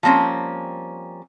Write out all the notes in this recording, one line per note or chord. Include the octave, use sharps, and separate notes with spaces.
F3 G3 A#3 C4 C#4